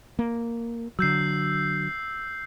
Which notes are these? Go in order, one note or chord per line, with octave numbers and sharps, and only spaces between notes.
A#3
D3 F#3 E6 G6 C7